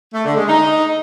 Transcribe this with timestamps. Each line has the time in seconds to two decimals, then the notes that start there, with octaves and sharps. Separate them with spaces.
0.13 A3
0.25 D3
0.37 G#3
0.49 D#4